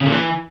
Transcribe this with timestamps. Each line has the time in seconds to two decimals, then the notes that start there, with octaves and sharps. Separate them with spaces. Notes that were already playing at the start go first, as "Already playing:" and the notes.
0.01 C#3
0.07 A#2
0.12 E3